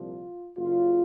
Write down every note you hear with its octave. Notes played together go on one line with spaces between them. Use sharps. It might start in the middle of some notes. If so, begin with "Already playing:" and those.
Already playing: C2 A#2 F3 F4
F#1 F#2 C#3 F4